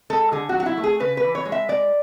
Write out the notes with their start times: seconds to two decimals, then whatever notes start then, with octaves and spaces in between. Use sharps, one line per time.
0.10 G#3 A4
0.32 D3 G#4
0.49 F#4
0.55 F#3
0.60 F#4
0.66 E4
0.77 A3
0.84 G#4
1.00 C#3 B4
1.17 B4
1.24 E3
1.35 C#5
1.45 G#3
1.52 E5
1.68 G#3 D5